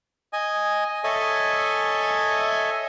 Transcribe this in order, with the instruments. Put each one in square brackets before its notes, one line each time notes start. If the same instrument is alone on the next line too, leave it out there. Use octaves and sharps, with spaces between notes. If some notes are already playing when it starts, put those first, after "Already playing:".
[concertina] D#5 G#5
A4 C#5 D#5 E5 G#5